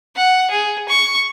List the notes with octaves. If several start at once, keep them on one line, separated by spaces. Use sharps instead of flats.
F#5
G#4
C#6